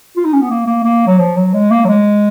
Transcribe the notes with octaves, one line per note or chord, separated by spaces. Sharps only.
F4
D#4
C#4
B3
A#3
A#3
A#3
F#3
F3
F#3
G#3
A#3
F#3
G#3